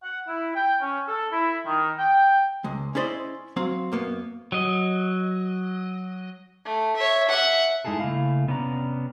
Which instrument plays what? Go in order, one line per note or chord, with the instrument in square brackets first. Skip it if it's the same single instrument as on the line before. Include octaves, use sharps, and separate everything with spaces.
[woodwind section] F#5
E4
G5
C#4
A4
E4
D#3
G5
[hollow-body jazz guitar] C#2 G#3
C#4 E4 G#4 C5 D5 D#5
F#3 C4 F5
F#2 A#3 B3
[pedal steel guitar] F#3 D#5
[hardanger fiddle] A3
C#5 E5
E5 F#5
[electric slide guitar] G#3 D#4 E4 G#4 A4
C#3 A3 A#3 E4 F5
C3 B3 C#4 D4 C5 A#5